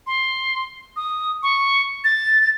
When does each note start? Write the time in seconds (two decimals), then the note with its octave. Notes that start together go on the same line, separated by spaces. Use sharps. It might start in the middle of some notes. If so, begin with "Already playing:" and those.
0.07 C6
0.96 D#6
1.43 C#6
2.04 A6